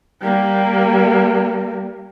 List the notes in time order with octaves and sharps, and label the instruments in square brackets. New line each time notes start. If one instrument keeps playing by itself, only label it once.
[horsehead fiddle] G3 A#3